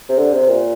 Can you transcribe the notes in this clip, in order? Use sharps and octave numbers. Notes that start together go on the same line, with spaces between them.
C3
D3
C3
A#2